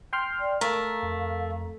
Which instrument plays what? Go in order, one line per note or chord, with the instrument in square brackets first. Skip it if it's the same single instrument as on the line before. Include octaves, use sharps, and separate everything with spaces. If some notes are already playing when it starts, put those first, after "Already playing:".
[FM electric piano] G5 C6 F6
[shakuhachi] D5
[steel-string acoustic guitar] A3 [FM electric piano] A#4 [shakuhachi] F5
[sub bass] F2